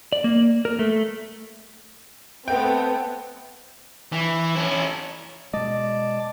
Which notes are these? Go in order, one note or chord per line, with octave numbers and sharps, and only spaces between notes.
D5
A#3
A#4
A3
A3 B3 C4 G5
E3
C#4 E4
B2 G#3 D5 D#5 A5